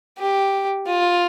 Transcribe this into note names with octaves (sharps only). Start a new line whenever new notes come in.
G4
F4